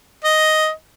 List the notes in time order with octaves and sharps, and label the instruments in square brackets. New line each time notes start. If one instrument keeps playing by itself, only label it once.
[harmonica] D#5